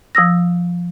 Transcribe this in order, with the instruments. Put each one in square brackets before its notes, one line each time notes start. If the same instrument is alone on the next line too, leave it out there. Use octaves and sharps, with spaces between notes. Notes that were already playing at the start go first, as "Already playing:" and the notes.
[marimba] F3 D#6 E6 A#6